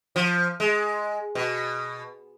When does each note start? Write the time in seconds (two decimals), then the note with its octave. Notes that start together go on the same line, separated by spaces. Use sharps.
0.16 F3
0.60 G#3
1.35 B2